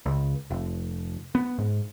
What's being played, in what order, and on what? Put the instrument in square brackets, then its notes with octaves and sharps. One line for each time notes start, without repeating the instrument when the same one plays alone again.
[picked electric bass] C#2
F1
B3
G#2